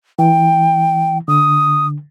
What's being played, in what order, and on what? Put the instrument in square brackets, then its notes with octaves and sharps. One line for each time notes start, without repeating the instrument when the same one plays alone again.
[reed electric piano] E3 [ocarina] G5
[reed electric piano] D3 [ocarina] D#6